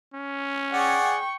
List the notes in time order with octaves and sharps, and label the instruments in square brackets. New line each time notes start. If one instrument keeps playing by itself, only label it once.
[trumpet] C#4
[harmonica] G#4 D5 F#5 [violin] G5 C#6